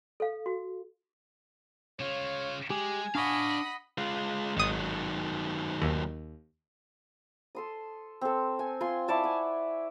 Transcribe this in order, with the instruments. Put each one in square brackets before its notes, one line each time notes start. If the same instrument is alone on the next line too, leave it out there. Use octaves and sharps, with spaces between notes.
[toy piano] A4 F5
F#4
[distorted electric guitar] C#3 F4 [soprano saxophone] C#5
[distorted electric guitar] G#3 [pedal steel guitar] G4 [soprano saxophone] G#5
[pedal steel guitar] D4 C#6 [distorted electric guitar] D5 F5 [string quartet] D#5 F#5 B5
[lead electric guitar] G#3 F4
[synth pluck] G#1 D#6 [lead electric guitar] D#3 F#3
[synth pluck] D#2
[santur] A4 C6 D#6
C4 A4
G#5
F4 G#5 C6
E4 D5 A5 C#6
F#5 G#5